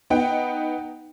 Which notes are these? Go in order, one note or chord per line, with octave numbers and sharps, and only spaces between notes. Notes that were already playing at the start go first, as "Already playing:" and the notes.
B3 D#4 F#5 G5